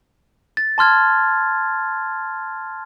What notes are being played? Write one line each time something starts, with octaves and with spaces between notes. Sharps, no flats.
A6
A5 C6 F6 G#6